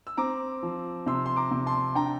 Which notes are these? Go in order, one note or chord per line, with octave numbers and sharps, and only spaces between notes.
E6
C4 A#5 D6
F3
C3 C6 E6
C6
A#5 D6
C3
A5 C6
D4 G5 A#5